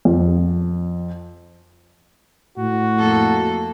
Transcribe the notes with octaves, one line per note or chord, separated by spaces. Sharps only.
F2
A2 F#4
F2 A#3 A4